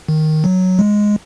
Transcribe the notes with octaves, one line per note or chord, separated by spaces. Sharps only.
D#3
F#3
G#3